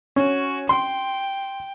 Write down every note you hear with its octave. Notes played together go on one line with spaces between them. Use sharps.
C#4 F#4
G5 C6